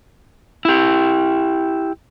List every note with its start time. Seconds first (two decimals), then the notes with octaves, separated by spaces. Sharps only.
0.65 E4 G4